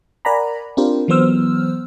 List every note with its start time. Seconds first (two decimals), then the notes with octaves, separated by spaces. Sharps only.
0.25 A#4 D5 F#5 G#5 A#5 B5
0.77 C4 D4 F4 G4 A#4 C5
1.08 E3 F#3 B3 C5 E6 F6